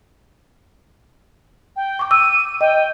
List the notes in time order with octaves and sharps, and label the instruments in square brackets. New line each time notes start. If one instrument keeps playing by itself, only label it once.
[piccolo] G5
[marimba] C#6 D6
[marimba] D6 E6 [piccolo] D#7
[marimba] D#5 [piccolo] G5